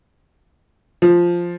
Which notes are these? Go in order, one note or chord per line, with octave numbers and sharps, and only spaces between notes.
F3